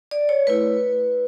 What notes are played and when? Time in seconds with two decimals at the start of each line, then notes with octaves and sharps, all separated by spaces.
0.11 D5
0.29 C#5
0.47 A3 E4 B4